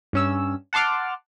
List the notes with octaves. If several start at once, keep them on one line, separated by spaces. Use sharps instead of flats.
G2 C#4 E6
F#5 A5 C6 D6 F6